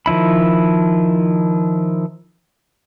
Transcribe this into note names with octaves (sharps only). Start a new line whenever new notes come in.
D#3 F3 E4 B5